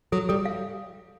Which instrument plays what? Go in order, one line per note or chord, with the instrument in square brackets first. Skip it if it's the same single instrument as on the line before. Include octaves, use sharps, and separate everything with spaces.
[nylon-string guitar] F#3 [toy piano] A4
[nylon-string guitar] G3 [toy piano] A4
[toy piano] F5